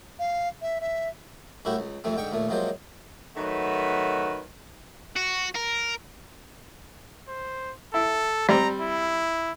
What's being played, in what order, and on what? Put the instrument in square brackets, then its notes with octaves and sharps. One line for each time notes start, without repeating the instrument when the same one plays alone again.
[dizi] F5
E5
E5
[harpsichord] C2 A2 E4 F#4 G4
C#2
F2 C3 A3 C4
G#2 D3 G5 C#6
D#2 A#2 A3
C3 F3 F#3 G#3 A#3 C5
[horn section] D#3 F#3 A3 F#4 B4
[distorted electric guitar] F#4
A#4
[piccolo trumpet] C5
[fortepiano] E4 [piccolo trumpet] A4
[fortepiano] G3 C4 [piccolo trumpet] A#5
[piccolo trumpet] E4